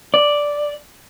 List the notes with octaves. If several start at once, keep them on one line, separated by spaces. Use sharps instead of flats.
D5